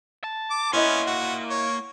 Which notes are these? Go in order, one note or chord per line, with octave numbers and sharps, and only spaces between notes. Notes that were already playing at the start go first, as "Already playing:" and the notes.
A5
D6
A#3 B3 C#4 E4 D#5 E5 C6
F#4
C#5